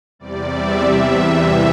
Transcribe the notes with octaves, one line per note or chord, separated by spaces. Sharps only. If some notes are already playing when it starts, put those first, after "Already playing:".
E2 C3 G3 D5
E5
E2 C3 E3 G3